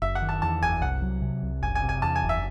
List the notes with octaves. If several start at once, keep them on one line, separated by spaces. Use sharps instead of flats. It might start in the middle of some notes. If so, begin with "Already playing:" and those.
F#1 E5
F#5
D#3
A5
E2 A5
F#1 G#5
C2 F#5
F#3
C3
C2
F#1 G#5
G#5
C3
G#5
E2 A5
G#5
F#1
E5